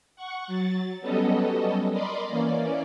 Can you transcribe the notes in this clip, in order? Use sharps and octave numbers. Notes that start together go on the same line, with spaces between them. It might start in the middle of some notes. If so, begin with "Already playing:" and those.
F#5 C#6
F#3 A6
F#3 G3 B3 C#4 A4 D#5
A#4 D5 D#5 B5 C6 D6
E3 A#3 C#4 D5